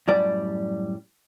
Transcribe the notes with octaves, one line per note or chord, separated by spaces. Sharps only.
F#2 A2 G3 D5